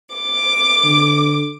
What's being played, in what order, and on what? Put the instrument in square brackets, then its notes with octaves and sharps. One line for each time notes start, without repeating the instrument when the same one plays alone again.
[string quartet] D6
[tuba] D3